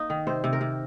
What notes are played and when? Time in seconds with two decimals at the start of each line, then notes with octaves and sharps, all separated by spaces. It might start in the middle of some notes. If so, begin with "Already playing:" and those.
Already playing: A#3 D#4 D#5
0.10 D#3
0.27 C3 C5
0.44 C3
0.53 A#4
0.61 C3